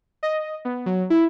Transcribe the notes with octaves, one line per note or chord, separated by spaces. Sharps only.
D#5
B3
F#3
E4